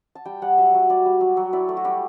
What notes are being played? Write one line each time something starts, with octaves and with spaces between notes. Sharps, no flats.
A5
G3 G5
G3 F#5
F#3 E5
F#3
G3 D5
G3
F#3
F#3
E4 D5
A3
F#4
G3 G4